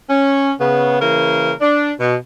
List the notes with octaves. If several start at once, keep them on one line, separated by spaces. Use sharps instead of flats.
C#4
C#3 B3
C#3 E3 A#3 A#4
D4
B2